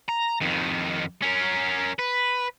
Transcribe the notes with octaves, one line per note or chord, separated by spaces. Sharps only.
A#5
F2 D#3
C#4 A#4
B4